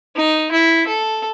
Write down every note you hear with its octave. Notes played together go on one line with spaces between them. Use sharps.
D#4
E4
A4